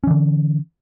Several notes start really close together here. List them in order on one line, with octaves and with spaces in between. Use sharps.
C#4 E3 D3